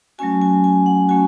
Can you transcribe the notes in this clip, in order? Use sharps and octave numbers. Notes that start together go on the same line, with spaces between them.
F#3 A3 C#4 F#4 G#5
G#5
G#5
F#5
A3 C#4 F#4 G#5